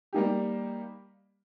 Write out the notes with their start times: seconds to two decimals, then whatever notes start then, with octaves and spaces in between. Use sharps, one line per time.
0.13 G3 A#3 D#4 G4